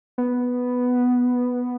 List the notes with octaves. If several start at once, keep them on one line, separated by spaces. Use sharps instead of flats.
B3